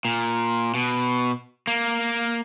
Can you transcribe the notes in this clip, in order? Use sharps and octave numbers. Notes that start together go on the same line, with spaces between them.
A#2
B2
A#3